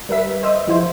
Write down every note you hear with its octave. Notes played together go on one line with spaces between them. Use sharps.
G3 A#4 B4 E5 B6
C5 D#5 E5
F3 E4 F4 C5